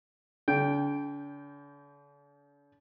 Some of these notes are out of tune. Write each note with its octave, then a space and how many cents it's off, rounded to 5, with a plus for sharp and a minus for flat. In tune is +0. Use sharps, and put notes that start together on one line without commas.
D3 -45 G5 +0